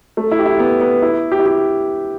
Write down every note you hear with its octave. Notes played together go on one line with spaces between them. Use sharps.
A3
E4
G4
E4
B3
B3
E4
G4
E4
G4